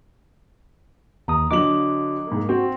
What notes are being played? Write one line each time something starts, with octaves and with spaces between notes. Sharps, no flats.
D#2 A#5 D#6
D3 F#3 D#5 D6 F#7
G#2 A#3
C4 F#4